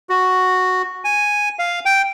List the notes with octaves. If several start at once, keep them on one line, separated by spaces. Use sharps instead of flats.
F#4
G#5
F5
G5